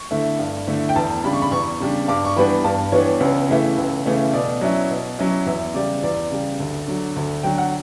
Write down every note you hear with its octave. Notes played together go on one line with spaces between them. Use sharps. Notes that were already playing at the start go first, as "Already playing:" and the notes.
Already playing: C#6
D3 A3 E4
G2
D3 A3 E4
G5
E2 A5
C#3 G3 D4 B5
C#6
B5
E2 C#6
C#3 G3 D4
G2 D6
C#6
E3 G3 B3 D4 B5
G2 A5
E3 G3 B3 D4 C#5
C#2
C#3 E3 A3 E4
C#2
C#3 E3 A3 E4
B2 D5
F#3 C#4 E4
B2
F#3 C#4 E4
E2 E5
C#3 G3 D5
E2 D5
C#3 G3
D2
D3 F#3
D2
D3 F#3 G5
F#5